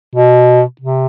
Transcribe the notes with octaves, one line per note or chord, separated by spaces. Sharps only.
B2
C3